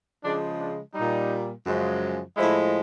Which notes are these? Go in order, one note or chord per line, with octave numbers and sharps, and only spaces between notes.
C#3 F3 G#3 D4
D4
A#2 G3 D#4
F#2 C#3 F3 G#3
A2 F3 G#3 E4